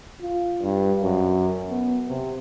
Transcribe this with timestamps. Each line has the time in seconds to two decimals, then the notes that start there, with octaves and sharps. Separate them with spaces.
0.22 F4
0.61 G2
1.03 F#2
1.70 B3
2.09 C3